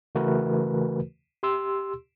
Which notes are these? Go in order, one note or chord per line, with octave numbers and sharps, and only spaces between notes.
C#3 E3 A3 F#4 A#4 B4
G4 C6 E6